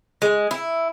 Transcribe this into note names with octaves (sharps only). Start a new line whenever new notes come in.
G#3
E4